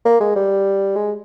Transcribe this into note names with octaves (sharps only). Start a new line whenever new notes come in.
A#3
G#3
G3
G#3